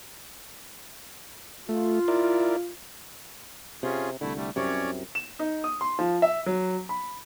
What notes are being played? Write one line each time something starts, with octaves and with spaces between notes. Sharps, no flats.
A3 F4
E4 A#4 D5
C3 C#4 F4 G#4
C2 D3 A3 E4
G3 A3
C2 F#2 C3 C#4 C#5 D5
E7
D#4
D#6
C6
F3
E5
F#3
B5